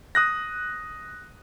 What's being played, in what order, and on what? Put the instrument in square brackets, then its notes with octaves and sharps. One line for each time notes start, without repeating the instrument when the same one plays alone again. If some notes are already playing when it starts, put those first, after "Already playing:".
[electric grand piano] D#6 F#6 A#6